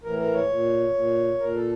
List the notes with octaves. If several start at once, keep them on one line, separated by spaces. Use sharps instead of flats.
A2 E3 A#4
A#4
C#5
A#2
A#2
A#2 A#4
A4